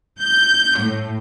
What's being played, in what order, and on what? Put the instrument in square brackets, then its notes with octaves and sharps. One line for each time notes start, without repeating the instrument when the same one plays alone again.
[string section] G6
A2